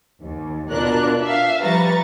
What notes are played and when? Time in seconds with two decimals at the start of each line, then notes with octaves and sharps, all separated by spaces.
0.21 D#2
0.70 B2 D4 F4 A#4 F#6
1.23 E5 F5
1.61 F3 G3 B4 A#5 C#6 A6